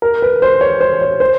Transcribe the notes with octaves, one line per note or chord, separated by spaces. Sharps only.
A#4
B4
C5
C#5
C5
C#5
C5